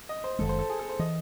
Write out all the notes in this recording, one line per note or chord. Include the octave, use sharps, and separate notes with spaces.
D#5
C5
F#1 E2 D#3 G#3 A4
C5
A4
G#4
A4
C5
E3 D#5